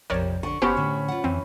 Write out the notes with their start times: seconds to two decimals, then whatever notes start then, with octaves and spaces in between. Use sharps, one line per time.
0.10 A#1 F2 C3 A#4 C#5 D5
0.43 D3 D4 C#6
0.62 F#1 B3 C#4 F#4 G4 C5 C#5 B5
0.77 A2 D3
1.08 F4 F#5
1.24 F2 E3 C4